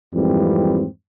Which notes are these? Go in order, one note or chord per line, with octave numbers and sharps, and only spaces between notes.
F2 G#2 E3 G3 A#3 C4